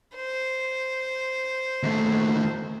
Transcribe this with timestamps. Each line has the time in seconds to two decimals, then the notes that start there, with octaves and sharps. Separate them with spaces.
0.15 C5
1.83 D#2 A3